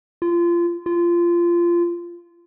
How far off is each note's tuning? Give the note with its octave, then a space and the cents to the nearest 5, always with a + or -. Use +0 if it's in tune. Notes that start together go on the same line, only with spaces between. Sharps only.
F4 -25
F4 -20